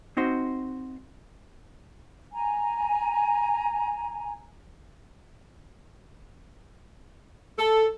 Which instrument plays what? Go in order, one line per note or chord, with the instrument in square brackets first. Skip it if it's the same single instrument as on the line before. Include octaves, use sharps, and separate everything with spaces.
[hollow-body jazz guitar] C4 D#4 F#4 C5
[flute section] G#5 A#5
[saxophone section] A4